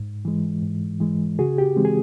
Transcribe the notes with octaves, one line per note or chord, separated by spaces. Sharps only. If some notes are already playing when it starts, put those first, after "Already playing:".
Already playing: G#2
E3 G#3
G#2
E3 G#3
C#3 F#4 G#4
G4
E3 G#3 C4
G#4